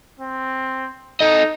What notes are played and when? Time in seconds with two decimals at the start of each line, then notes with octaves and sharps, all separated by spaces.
0.20 C4
1.20 D#4 A4 D#5